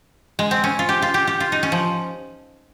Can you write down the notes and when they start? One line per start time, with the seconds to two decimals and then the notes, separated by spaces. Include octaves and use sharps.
0.39 G#3
0.51 C4
0.64 C#4
0.79 F4
0.89 G4
1.02 F4
1.14 G4
1.27 G4
1.40 F4
1.52 D#4
1.63 C#4
1.72 F3